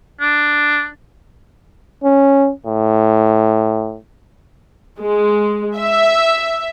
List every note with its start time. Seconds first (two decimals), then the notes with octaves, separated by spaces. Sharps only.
0.21 D4
2.04 C#4
2.66 A2
5.00 G#3
5.76 E5